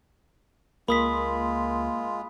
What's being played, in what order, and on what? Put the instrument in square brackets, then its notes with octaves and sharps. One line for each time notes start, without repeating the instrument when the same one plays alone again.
[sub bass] C#2 [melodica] G#3 F4 [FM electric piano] A#3 [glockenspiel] B5 D#6 B6